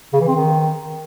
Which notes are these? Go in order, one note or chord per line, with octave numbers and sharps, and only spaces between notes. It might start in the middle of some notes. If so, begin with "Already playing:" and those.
C#3
E3
C4
D#3